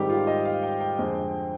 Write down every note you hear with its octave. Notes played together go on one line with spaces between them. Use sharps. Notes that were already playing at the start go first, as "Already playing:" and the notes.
Already playing: G#2 D#3 G3 C4 G4
F4
D#5
F5
G5
G5
F2 D3 G#3 C4